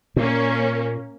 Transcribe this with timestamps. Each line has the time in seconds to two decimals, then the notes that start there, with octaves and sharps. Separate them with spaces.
0.16 A#2 A#3 C#4